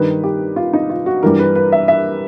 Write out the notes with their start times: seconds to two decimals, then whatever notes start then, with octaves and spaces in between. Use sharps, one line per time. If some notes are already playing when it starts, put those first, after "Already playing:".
Already playing: G2 D#3 G3 B4
0.23 G4
0.56 F4
0.73 D#4
0.90 F4
1.06 F#4
1.23 G2 E3 G3 A#4
1.39 B4
1.55 B4
1.72 E5
1.88 E5